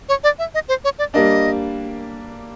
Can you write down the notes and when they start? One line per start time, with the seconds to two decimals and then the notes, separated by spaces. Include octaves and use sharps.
0.09 C#5
0.24 D5
0.39 E5
0.54 D#5
0.69 C5
0.84 C#5
0.99 D5
1.14 G3 A#3 D4 D#5